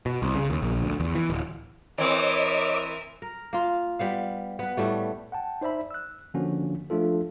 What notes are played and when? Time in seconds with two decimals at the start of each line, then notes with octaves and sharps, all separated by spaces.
0.06 B2
0.22 C2
0.35 C#3
0.50 D#2
0.62 A#1
0.82 D2
1.00 E2
1.15 E3
1.30 D1
1.98 E3 C4 A#4 C#5 D#5 E5 D6
3.22 A#4
3.53 A#3 F4
3.99 G3 B3 F5
4.59 B3 B4
4.77 A2 G3 A3
5.32 F#5 G5 A5
5.61 D#4 C5 D5 E5 B5
5.91 E6 F#6
6.34 D3 F3 A#3 C#4 D4 F#4
6.90 F3 A3 D4 F4 A4